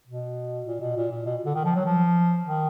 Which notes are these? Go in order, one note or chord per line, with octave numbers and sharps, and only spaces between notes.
B2
A#2
B2
A#2
A#2
B2
D3
D#3
F3
F#3
F3
D#3